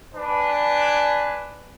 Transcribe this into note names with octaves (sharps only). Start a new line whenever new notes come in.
D4 B4 G#5